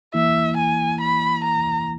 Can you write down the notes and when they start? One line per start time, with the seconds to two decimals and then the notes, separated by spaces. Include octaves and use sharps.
0.14 E3 A#3 E4 E5
0.57 G#5
1.01 B5
1.44 A#5